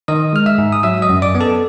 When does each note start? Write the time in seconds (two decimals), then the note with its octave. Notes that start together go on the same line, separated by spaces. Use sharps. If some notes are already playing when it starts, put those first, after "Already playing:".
0.08 D#3 D#5 D#6
0.33 G#3 F6
0.46 E5 E6
0.58 G#2
0.73 D#6
0.83 F#3 E5 E6
1.02 D#5 D#6
1.09 F#2
1.22 D5 D6
1.35 B3
1.40 A4 A5